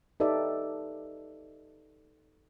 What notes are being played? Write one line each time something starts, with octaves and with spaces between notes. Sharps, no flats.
D#4 G4 A4 B4 D5 E5